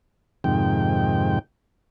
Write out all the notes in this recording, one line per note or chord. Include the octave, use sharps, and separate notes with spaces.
F2 G#2 C3 D#3 G5